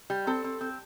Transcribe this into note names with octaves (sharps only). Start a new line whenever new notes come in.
G3
C4 A4
C4
C4